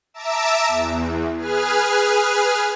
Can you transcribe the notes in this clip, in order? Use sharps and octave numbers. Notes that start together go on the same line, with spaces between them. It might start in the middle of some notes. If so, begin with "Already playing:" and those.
E5 A5 A#5 D6 E6 E7
E2
G#4 B4 G#5 F6